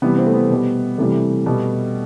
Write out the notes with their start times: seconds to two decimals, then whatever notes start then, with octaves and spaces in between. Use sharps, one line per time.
0.02 C3 E3 G3 B3
0.18 C4
0.27 A3
0.34 B3
0.50 B2 G3
0.98 C3 E3 G3 A3
1.46 B2 G3